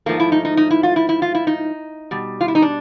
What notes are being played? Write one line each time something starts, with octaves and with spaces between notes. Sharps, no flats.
G#2 F3 A3 A#3
E4
D#4
D#4
D#4
E4
F4
E4
E4
F4
E4
D#4
B2 G3
F4
E4
D#4
D4